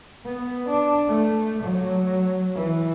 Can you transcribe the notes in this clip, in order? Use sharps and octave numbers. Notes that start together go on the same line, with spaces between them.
B3
D4
A3
F#3
E3